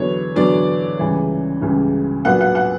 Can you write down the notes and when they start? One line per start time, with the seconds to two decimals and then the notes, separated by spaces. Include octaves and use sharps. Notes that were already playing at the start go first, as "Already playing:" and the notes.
Already playing: E2 D3 F#3 B3 D4 C#5
0.36 E2 D3 F#3 B3 D4 D5
0.99 C#2 C#3 E3 G3
1.61 C#2 C#3 E3 G3
2.25 A#2 F#3 B3 D4 F#5
2.41 F#5
2.55 F#5